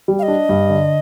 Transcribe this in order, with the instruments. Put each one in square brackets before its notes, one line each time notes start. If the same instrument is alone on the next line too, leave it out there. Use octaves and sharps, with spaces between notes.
[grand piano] G3
[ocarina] F5
D#5
[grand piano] D4
G2
D3